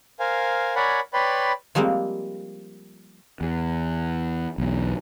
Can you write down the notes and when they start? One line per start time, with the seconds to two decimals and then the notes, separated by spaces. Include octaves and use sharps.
0.20 A#4 C5 F5 G#5
0.76 A#4 C#5 D5 F#5 G#5 B5
1.13 B4 C#5 D5 G5 B5 C6
1.75 F3 G3 G#3 A#3 C4
3.41 E2
4.58 B1 E2